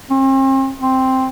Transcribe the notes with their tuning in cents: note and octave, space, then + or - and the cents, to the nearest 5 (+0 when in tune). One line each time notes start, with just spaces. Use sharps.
C4 +40
C4 +0